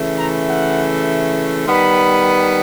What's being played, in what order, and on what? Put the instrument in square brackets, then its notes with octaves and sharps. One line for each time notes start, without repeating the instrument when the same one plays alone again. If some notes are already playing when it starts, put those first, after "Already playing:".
Already playing: [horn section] C#3 E3 A3
A#5
F#5
D#3 G3 B3 B5